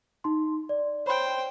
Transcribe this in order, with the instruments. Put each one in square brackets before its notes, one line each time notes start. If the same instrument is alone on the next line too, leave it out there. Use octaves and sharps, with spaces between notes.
[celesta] D#4 C6
D5
[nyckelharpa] C5 G5 [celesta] C#5 B5 C6